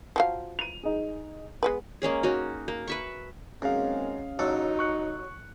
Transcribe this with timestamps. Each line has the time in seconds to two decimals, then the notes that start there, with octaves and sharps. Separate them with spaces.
0.16 F3 F#3 F5
0.59 D#7 F7
0.83 D#4 G#4
1.63 G#3 B3 B4
2.02 G#3 A#3 C#4 G#4
2.23 C#4 D#4 F#4
2.68 A#3
2.88 B4 E5 C#6
3.62 F#2 D#3 G#3 A#3 C4 C#4 G#4 F5
4.39 A1 F#3 D#4 F#4 A4
4.79 C#6 F#6 C#7